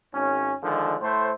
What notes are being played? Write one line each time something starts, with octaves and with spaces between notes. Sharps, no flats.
G#1 C#4
D3 D#3 F3 G#3
A2 A3 C5